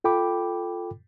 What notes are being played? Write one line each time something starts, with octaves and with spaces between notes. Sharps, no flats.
F4 A4 G5 B5 D6